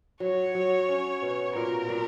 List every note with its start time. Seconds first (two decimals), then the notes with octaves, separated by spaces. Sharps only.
0.20 F#3 C#5
0.55 F#3
0.88 C#4
1.22 B2
1.55 A#2 A#4
1.89 A#2